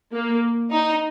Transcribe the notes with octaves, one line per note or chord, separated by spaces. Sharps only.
A#3
D#4